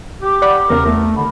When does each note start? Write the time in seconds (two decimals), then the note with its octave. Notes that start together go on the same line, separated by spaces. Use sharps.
0.22 G4 D6
0.42 D5 F#5 B5
0.70 E2 C#3 A#4
0.86 E2 A3
1.17 D3 B5